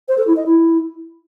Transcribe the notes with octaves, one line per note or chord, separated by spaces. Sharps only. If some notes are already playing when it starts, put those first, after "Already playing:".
C5
A4
E4
D#5
E4